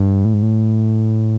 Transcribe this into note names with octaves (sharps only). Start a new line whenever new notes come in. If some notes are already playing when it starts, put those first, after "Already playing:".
Already playing: G2
A2
G#2
A2